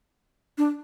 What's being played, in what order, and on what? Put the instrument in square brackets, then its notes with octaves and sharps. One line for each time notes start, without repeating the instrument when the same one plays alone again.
[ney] D4